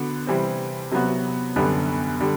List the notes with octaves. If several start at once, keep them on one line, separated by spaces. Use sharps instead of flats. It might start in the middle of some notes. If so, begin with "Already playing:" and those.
Already playing: D3 B3 F#4
C3 E3 G3 C4
C3 F#3 B3 F#4
F#2 D3 G3 B3
D3 G3